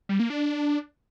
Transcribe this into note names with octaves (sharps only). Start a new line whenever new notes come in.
G3
A#3
D4